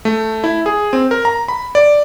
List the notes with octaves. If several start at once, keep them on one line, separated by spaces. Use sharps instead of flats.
A3
E4
G#4
C4
A#4
A#5
B5
D5